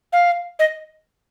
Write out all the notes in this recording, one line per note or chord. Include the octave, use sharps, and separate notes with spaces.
F5
D#5